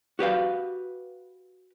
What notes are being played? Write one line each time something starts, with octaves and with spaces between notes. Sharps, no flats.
F#4 G4 B4 F5